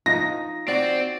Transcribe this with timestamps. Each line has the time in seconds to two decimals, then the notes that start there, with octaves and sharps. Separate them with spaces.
0.06 F3 D#4 A#6
0.68 C4 F#4 D5